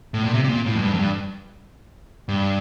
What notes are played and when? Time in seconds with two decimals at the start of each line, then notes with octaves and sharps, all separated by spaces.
0.14 A2
0.23 A#2
0.34 C3
0.44 C3
0.49 A#2
0.66 A2
0.75 F2
0.82 G2
0.94 F2
0.99 G2
2.29 G2